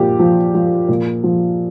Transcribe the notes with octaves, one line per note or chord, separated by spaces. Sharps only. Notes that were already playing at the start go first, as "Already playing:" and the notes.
Already playing: A#2 F3 G4
F3
F3
A#2
F3